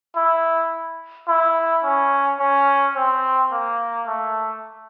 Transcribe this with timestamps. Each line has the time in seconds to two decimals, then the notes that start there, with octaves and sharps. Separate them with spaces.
0.16 E4
1.28 E4
1.84 C#4
2.39 C#4
2.95 C4
3.51 A#3
4.07 A3